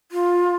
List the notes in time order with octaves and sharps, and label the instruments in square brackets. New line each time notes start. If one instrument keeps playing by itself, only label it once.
[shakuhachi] F4